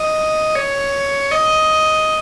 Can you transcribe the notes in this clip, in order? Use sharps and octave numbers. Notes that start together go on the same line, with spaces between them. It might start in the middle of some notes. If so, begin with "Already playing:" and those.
Already playing: D#5
C#5
D#5